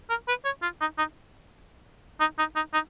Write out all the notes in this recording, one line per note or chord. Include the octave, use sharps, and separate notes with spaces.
A#4
B4
C#5
F4
D#4
D#4
D#4
D#4
D#4
D#4